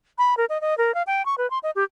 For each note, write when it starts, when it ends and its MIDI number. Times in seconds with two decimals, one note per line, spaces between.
0.18 0.37 83
0.37 0.45 70
0.49 0.60 75
0.61 0.77 75
0.78 0.94 70
0.95 1.03 77
1.07 1.25 79
1.26 1.35 85
1.38 1.49 71
1.50 1.59 84
1.63 1.71 75
1.75 1.84 67